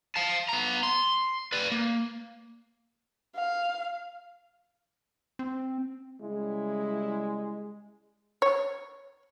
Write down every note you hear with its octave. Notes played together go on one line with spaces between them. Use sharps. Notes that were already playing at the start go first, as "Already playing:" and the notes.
F5 A5
B3 A#5
C6
B4 D5
A#3
F5
C4
C#3 G3 G#3 E4
C#5